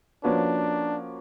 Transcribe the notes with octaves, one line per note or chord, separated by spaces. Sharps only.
F3 A#3 C#4 D4 F#4 B4